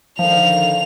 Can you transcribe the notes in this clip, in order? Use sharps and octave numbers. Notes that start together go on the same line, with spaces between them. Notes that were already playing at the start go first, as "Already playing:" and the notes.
D3 D#3 F3 F5 F7